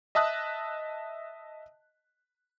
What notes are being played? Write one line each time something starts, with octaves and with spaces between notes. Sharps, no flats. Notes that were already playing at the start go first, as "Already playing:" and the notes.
D#5 E5 A5 D#6 F#6